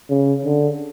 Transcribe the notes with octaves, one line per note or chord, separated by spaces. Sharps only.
C#3
D3